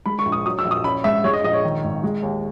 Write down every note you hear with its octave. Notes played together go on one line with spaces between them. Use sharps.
G#3 B5
C#6
A#1
D#6
F#3 D#6
E6
A#1
D#6
C#4 B5
G#2 E5
G#3 C#5
D#5
A#1 D#5
C#5
D#3
G#1
G#3
D#2